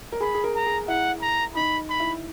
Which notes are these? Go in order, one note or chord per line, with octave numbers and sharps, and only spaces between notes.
A#4
G#4 B5
G#4
A#4
A#5
G#4
E4 F#5
A#5
D#4 B5
B5
E4